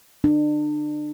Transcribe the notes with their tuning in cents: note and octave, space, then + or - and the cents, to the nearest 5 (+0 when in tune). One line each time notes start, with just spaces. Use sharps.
D4 +35